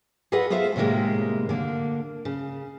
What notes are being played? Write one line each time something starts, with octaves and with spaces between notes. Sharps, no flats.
F4 G#4 A4 B4 D#5 F#5
B3 F4 A4 C5 E5 F5
A2 C3 D#3 F#3 G#3 A#3
D3 A#3
C#3